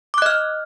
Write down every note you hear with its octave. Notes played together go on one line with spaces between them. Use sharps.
D#5 D6 F6 F#6